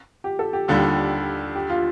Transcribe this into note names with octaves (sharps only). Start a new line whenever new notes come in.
G4
A4
G4
D#2 D3 G3 F4
G4
F4